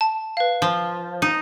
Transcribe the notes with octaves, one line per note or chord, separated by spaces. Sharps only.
A5
B4 F5
F3
D#4